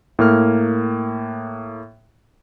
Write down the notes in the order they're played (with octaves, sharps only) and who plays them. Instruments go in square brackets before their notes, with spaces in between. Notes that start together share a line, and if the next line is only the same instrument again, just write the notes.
[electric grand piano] A2 A#3 F6